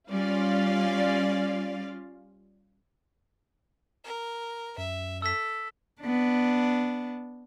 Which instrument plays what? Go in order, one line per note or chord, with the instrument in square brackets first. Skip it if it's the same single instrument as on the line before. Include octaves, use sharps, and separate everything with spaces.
[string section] G3 C#4 F4 D5 F5
[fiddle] A#4
[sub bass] F#2 [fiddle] E5
[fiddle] A4 [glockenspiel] E6 B6
[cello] B3 D4